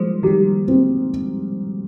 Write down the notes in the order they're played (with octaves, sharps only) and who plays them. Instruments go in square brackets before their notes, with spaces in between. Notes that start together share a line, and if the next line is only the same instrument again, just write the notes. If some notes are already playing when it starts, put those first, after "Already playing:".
Already playing: [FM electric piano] F3 G3 G#3 A#3 [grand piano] C5
[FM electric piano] D#3 G3 [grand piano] G4
[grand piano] C4